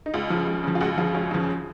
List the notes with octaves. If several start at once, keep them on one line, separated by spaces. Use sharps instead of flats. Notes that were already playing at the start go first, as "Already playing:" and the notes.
D#4
C#2 F4
C#3 F3
C#2
C#3 F3
F4
C#2 F#4
C#3 F3 F4
C#2 C#4
C#3 F3